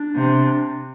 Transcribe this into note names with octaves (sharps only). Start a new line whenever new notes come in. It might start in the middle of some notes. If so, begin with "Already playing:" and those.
Already playing: D4
C3